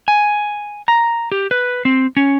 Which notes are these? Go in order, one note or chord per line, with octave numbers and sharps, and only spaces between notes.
G#5
A#5
G4
B4
C4
C#4